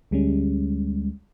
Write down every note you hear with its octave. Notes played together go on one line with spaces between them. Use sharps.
D2 G3 G#3 C#4